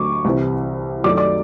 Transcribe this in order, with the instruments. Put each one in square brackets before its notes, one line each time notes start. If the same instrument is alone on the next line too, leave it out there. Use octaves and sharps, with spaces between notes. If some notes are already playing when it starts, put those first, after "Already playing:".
Already playing: [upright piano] D2 D3 F#3 A3 C#6 D6
C2 C3 E3
F#2 D#3 F#3 A3 D5 D6
D5 D6